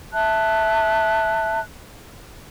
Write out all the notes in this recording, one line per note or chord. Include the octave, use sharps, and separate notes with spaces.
E5 A5 F#6